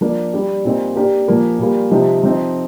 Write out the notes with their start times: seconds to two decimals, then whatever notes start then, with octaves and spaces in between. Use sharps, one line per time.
0.01 F3 A#3 D4
0.33 G3 D4 G4
0.65 A#2 G3 C4 D#4
0.96 A#3 D4 G4 A#4
1.28 A#2 F3 A#3
1.59 A#2 G3 A#3 F4
1.91 C3 F3 C4 D#4 G4
2.23 F3 C4 D#4